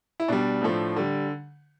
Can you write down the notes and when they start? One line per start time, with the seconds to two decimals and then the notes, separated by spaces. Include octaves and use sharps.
0.20 E4
0.28 B2 G3 D4
0.62 A2 F3 A3
0.96 D3 G3